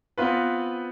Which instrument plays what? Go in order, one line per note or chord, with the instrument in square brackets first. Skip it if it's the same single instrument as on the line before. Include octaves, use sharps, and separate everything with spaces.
[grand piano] B3 C4 F4 B4